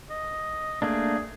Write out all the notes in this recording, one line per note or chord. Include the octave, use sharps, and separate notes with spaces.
D#5
A3 A#3 D4 G#4